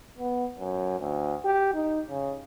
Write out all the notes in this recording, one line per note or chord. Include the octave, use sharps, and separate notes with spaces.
B3
F#2
D2
G4
D#4
C#3